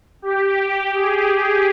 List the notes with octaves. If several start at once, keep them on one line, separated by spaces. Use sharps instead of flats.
G4
G#4
G#4